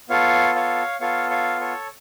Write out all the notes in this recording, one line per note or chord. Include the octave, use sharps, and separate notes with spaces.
B3 F4 A4 C#5 F5
C#5 F5
B3 F4 A4 C#5 F5
C#5 F5
A4 C#5